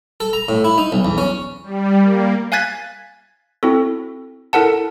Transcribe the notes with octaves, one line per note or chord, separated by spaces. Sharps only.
A4
A#5
A2
E4
D#4
B1
E2
C#4
G3
A#3
F5 G#5 F#6 G#6 A6 B6
C4 E4 F#4 A4
E4 A4 A#4 F#5 A5